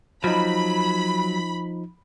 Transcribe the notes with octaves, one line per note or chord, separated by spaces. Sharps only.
F3 F#3 D#4 B5